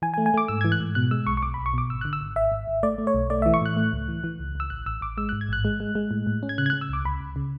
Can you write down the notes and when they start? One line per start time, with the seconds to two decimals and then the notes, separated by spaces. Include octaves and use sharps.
0.02 E3 G#5
0.14 G#5
0.18 A3
0.26 G#5
0.34 A3 D6
0.48 G#2 E6
0.61 E3 G#6
0.72 F#6
0.80 G#2
0.95 B2 F#6
1.11 G#3 E6
1.27 B1 C#6
1.37 C#6
1.43 B1 D6
1.54 B1 B5
1.66 C#6
1.74 B2 D6
1.90 G#1 E6
2.01 D3 F#6
2.13 E6
2.21 G#1
2.36 G#1 E5
2.52 G#1
2.67 G#1
2.83 A3 D5
2.98 A3
3.07 C#5
3.14 B1
3.30 A3 D5
3.42 E3 E5
3.54 C#6
3.61 A2 F#6
3.77 A3
3.93 C#2
4.08 E3
4.24 E3
4.40 C#2
4.55 C#2 E6
4.70 A1 F#6
4.86 A1 E6
5.01 A1 D6
5.17 G#3 E6
5.29 G#2 F#6
5.41 G#6
5.49 A1 F#6
5.65 G#3
5.80 G#3
5.95 G#3
6.11 A2
6.27 A2
6.43 C#4
6.49 G#6
6.58 C#3 F#6
6.66 G#6
6.70 C#3 F#6
6.81 E6
6.89 C#2 D6
7.05 C#2 B5
7.21 C#2
7.36 C#3